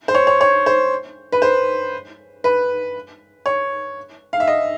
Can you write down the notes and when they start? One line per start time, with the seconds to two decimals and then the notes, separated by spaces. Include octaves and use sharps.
0.08 C5
0.15 C#5
0.27 C#5
0.41 C#5
0.66 C5
1.32 B4
1.42 C5
2.44 B4
3.46 C#5
4.33 F5
4.40 E5
4.48 D#5